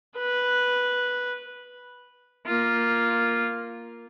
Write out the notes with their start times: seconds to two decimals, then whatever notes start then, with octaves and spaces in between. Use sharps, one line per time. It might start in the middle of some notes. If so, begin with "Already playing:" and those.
0.18 B4
2.46 A#3 F4